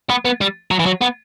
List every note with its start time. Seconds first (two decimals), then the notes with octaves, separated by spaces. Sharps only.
0.10 B3
0.25 B3
0.41 G3
0.71 F#3
0.79 E3
0.86 F#3
1.02 B3